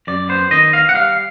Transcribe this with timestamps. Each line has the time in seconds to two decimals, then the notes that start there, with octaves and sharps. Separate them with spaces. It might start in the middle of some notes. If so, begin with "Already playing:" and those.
0.07 F#2 D5
0.29 B3 C5
0.51 D#3 D#5
0.73 B3 F5
0.89 F#5
0.94 G3 F5